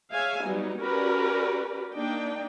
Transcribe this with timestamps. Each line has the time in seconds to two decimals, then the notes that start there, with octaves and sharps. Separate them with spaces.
0.12 G#4 C#5 E5 F5 G#5
0.44 F#3 G3 B3 D#4
0.81 C#4 F#4 G4 A#4 B4 D5
1.94 A#3 D4 D#4 G5